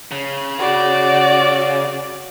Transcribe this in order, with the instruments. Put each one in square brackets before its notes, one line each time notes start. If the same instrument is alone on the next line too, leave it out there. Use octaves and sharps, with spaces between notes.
[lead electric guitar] C#3
[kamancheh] F#4 D5